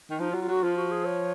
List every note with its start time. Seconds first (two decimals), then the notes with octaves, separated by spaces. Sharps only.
0.10 D#3
0.20 F3 D#4
0.31 F4
0.34 F#3
0.42 F4
0.48 F#3 F#4
0.63 F3 F4
0.77 F#4
0.91 G#4
1.05 C#5